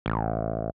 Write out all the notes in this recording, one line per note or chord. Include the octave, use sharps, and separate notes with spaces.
A1